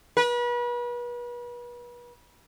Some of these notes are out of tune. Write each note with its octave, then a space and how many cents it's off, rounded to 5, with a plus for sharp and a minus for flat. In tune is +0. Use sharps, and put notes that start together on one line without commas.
B4 -35